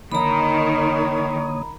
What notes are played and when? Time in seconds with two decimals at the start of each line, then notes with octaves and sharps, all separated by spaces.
0.12 D3 D#3 A#3 C#5 A#5 B5 D#6